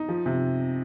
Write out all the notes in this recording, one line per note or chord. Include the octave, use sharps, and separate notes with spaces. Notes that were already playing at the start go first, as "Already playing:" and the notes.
Already playing: D#4
F3
C3